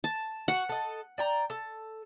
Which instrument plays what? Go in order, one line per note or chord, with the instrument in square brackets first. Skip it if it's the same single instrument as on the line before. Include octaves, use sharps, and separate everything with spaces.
[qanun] A5
[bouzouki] F#4 [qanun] F#5
[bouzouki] A4 D#5
D5 G5 A#5
A4